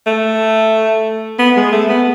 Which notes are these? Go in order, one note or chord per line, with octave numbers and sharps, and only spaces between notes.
A3
B3
G#3
A3
B3